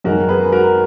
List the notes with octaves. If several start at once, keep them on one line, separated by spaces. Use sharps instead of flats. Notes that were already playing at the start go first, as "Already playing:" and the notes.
F#2 D#3 G#3 D#4 F#4 A#4
G#4 B4
F#4 A#4